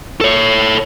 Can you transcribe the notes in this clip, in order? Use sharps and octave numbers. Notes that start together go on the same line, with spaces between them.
A4 C#5